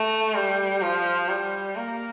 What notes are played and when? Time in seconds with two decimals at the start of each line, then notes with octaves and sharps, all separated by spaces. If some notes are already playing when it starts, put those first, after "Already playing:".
Already playing: A3
0.34 G3
0.82 F3
1.29 G3
1.76 A#3